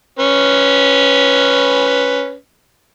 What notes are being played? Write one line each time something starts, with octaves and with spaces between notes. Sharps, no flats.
C#4 B4